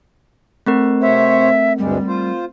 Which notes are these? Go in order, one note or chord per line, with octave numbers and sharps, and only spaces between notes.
A3 C4 A#4
C3 C5 C#5 E5
D2 G2 G3 G#3
F4 C5